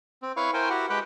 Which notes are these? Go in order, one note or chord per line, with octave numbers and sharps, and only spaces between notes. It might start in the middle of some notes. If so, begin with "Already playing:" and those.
C4
E4 B4 C#5 F5 C#6
E4 A#4 C5 G5 G#5
E4 F#4 G4 F#5
G#3 G4 B4 G5 F#6